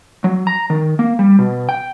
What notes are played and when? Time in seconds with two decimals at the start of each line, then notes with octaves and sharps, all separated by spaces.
0.24 F#3
0.47 A#5
0.70 D#3
0.99 A#3
1.19 G3
1.39 B2
1.69 G5